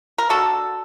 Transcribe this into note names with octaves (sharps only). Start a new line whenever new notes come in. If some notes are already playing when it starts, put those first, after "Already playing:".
A#4
D3 F#4 A4